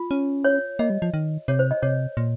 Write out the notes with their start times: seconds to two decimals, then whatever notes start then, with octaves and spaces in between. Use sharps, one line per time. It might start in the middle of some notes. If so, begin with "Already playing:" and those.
Already playing: F4
0.11 C#4
0.44 C#5
0.79 A#3 D#5
0.90 G3
1.02 F3
1.14 D#3
1.48 C3 C#5
1.59 C5
1.71 D#5
1.82 C3 C#5
2.17 A#2